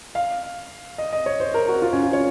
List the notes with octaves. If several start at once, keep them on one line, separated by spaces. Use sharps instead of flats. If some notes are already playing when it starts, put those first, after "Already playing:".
F5
D#5
D#5
C#5
C5
A#4
F#4
F4
C#4
F4
C#5